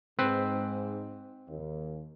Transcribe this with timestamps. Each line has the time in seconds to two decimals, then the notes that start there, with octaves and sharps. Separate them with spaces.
0.19 G#2 C4 B4
1.48 D#2